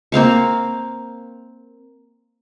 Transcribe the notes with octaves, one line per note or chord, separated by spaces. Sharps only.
A#3 C4 F5 C#6